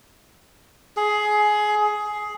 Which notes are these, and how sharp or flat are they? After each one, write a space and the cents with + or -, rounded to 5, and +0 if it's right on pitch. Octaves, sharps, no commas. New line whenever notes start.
G#4 +20
G#4 +15